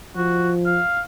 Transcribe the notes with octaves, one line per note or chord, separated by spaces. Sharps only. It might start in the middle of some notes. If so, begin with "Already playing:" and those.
F3 F#4
F5